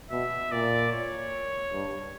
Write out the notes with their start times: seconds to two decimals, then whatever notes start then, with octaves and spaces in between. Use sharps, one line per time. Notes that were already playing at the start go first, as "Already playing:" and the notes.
0.11 B2 E5
0.52 A#2 D5
0.92 C#5
1.72 G2